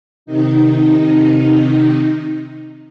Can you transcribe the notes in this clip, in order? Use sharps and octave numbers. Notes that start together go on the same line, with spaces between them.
C3 D#3 D#4